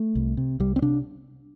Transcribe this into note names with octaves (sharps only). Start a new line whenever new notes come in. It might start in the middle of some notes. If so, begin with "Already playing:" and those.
Already playing: A3
C2
C3
C2 G3
C4
C3 D4